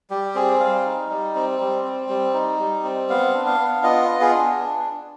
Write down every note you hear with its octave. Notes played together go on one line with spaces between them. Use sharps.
G3 G4
C4 G#4
G3 F5
D#4
G3
C4
G3
C4
G3
D#4
G3
C4
B3 F5
D4
F5
B3
F4 D#5
B3
G#4
D4